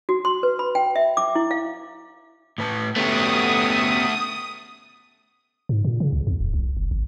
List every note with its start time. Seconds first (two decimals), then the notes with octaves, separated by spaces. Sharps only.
0.09 F#4
0.25 C6
0.43 B4
0.59 B5
0.75 G5
0.96 E5
1.17 D6
1.35 E4
1.51 F5
2.58 A2 B4 A5
2.96 A3 B3 C#4 F#4 G4 D#6
5.69 G#2
5.85 A#2
6.00 C#3
6.13 C2
6.27 E2
6.40 D1
6.54 B1
6.77 F1
6.91 G#1